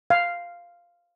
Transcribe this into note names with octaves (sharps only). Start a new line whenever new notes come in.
F5